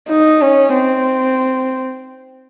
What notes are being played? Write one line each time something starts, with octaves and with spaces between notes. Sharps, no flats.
D#4
C#4
C4